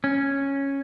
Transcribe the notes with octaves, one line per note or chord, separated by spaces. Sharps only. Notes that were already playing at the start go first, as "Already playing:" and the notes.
C#4